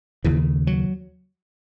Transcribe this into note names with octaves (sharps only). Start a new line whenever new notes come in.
D#2 C#3 E3
F#3